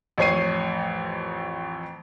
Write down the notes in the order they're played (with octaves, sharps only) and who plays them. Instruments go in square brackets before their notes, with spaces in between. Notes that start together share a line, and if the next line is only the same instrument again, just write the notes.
[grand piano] A1 F2 C#5 C7 D#7